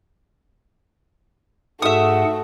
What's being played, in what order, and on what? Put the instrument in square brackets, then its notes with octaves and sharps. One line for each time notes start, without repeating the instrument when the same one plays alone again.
[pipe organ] G#2 G#4 F#5 [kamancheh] A3 F#4 [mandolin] E5 D#6